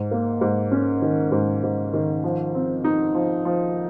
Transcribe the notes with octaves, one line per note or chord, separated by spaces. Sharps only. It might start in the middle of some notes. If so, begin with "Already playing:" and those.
Already playing: G#2
A#3
G#2
C#4
D#3
G#2
G#2
D#3
F3
C4
D#4
F3
F3